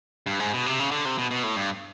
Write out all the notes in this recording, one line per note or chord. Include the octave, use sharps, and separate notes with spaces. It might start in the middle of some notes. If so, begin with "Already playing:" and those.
G2
G#2
B2
C3
C#3
D3
C3
B2
B2
A2
G2